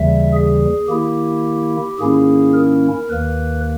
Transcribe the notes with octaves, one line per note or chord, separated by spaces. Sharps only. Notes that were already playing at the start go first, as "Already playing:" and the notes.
Already playing: D#2 C#3 E3 G3 E5
G#4
D#3 A#3 E4 G4
G#2 D#3 A#3 C#4 E4 G#4
A#4
D#2 D#3 A#3 B4